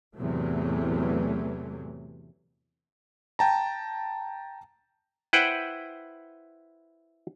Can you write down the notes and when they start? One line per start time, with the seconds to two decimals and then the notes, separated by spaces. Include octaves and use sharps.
0.16 E2 A2 C3 E3 F#3 A3
3.39 G5 A5 A#5
5.33 E4 B4 C5 F#5 G5